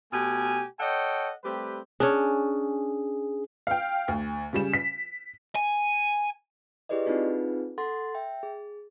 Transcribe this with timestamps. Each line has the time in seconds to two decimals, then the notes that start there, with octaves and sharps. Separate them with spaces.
0.13 B2 A3 G4 G#5
0.80 A4 C#5 D#5 F#5 G5
1.44 G3 A3 C4 G4 B4
2.00 C#4 D4 G#4
3.67 F5 G5
4.08 D2
4.53 C#3 G3 E7
4.74 B6
5.56 G#5
6.89 E4 G4 G#4 B4 D5 D#5
7.05 C4 D4 D#4 F4 G#4 B4
7.78 A4 F#5 C6 A6
8.15 E5 G5
8.43 G#4